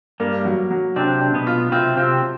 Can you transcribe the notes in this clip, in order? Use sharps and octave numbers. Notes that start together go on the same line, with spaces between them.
G2 G3 A#3
F#3
F#3
C3 C4 D4
D4
B2 B3
F4
C3 C4 F4
C3 C4 F4